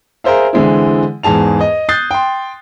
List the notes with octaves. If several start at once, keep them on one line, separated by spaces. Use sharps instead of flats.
G#4 A#4 C5 E5 F5
D3 E3 G#3 C4 E4
E2 G#2 G#4 A5 F7
D#5
D#6 F#6 G6 A6 C7
G5 C6